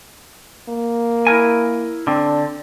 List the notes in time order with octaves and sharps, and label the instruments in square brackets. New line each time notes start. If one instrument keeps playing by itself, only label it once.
[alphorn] A#3
[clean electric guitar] E4 A#4 G#5
[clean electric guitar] D3 C4 [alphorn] D4